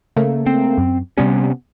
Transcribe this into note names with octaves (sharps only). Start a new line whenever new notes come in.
C#3 A3 A#3
C4
F#2
C3 G3 B3 C#4